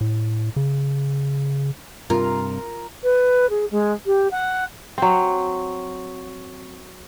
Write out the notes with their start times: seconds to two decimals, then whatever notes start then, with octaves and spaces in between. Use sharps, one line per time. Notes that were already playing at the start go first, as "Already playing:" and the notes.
0.01 A2
0.56 C#3
2.10 G2 C3 F4 A#4
3.03 B4
3.50 G#4
3.71 G#3
4.06 G4
4.31 F#5
4.98 F#3 C4